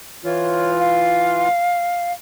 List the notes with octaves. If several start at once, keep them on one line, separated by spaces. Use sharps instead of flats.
E3 F4 C#5
F5